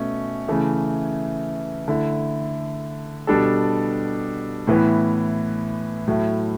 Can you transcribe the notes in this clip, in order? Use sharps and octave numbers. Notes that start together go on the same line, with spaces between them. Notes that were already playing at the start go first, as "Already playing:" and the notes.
Already playing: B2 A3 C#4
C#3 E3 A3
D3 A3 E4
B2 G3 D4 A4
A2 E3 B3
A2 F#3 A3 E4